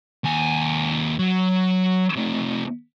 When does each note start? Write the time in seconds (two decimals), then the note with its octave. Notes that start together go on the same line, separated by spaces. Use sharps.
0.24 D#2 G#5
1.19 F#3
2.16 C3 A3